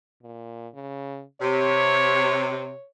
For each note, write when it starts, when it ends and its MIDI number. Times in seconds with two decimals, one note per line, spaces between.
0.22 0.68 46
0.74 1.23 49
1.41 2.73 48
1.41 2.86 73